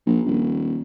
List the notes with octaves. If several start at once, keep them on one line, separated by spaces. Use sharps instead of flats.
A#1
D#1